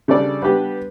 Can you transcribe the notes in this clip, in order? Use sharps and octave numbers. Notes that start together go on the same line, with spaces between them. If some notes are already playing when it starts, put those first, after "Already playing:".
C#3 G3 D4 A4 D5
G3 B3 D4 G4 B4